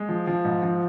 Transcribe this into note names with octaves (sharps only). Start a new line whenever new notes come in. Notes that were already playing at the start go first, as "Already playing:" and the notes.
Already playing: G#3
F3
F3
G#2
F3